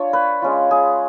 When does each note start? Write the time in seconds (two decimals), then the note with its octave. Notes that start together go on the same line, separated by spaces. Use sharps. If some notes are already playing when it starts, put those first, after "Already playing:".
Already playing: D4 F4 C#5
0.13 B4
0.42 G#3 C#4 F4
0.71 G#4